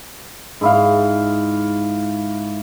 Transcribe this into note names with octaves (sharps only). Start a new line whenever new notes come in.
G#2 E4 F5